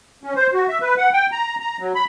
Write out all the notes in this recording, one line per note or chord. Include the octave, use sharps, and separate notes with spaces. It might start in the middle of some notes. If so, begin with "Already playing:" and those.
C#4
C5
F#4
E5
B4
F#5
G5
A#5
A#5
F#3
B5